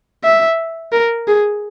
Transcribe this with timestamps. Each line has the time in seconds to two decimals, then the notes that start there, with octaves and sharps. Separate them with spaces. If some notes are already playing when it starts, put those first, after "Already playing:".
0.24 E5
0.92 A#4
1.28 G#4